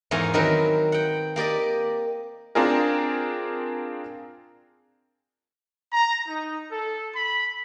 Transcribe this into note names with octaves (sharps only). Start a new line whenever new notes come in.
E2 G#2 A#4 C#5 F5 G#5
D#3 F#3 C4 D#4 A#4 B4
F#5 G5
A#3 G4 D5 D#5
C4 D4 F4 G#4 A#4
A#5
D#4
A4
B5